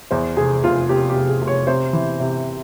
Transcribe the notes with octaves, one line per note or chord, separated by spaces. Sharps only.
E2 C5
F1 G#4
F1 F4
F1 G4
G4
F1
G#4
F1
C#5
C3 C5
E3
C3